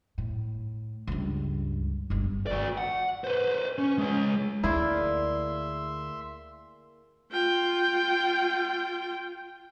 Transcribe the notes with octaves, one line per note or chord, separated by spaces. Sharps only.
A2
C#2 G2
G1 G3
F#4 D5
F#5
B4 C5
C#4
G#3 C#5
D2 A#3 E4 G#4 D5 E5 C6
F4 G5